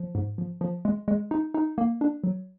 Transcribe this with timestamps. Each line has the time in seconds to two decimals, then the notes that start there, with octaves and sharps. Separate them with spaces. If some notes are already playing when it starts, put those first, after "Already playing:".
Already playing: F3
0.15 G#2
0.38 F3
0.61 F3
0.85 G#3
1.08 G#3
1.31 D#4
1.54 D#4
1.78 A#3
2.01 D4
2.24 F#3